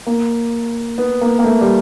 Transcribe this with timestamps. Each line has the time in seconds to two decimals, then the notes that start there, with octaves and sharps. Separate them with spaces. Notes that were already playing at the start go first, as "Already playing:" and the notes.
0.07 A#3
0.98 B3
1.21 A#3
1.39 A#3
1.45 A3
1.61 G3